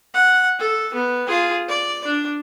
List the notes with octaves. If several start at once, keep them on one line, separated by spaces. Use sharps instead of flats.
F#5
A4
B3
F4 G#4
D5
D4